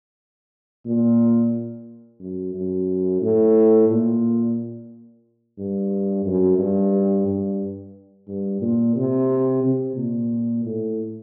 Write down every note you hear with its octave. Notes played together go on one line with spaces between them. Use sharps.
A#2
F#2
F#2
A2
A#2
G2
F#2
G2
G2
G2
A#2
C3
C3
A#2
A2